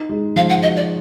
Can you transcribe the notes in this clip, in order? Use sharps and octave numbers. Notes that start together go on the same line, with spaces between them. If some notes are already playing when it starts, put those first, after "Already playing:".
Already playing: D#4
G#3
F3 F5
F#5
F#4 D#5
D5